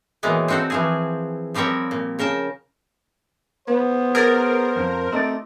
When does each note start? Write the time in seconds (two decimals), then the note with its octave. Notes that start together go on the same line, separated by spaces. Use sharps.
0.23 A#2 D#3 E3 F#3 G#3 B3
0.48 C4 D#4 F#4 A4 C5
0.70 E3 F3 G#4
1.54 F3 G3 C4 A#4 C#5
1.91 A#2
2.19 C#3 A#4 G5 A5
3.68 B3 C5
4.15 G#4 A#4 D5
4.76 F2
5.12 A3 C4 D#4 D5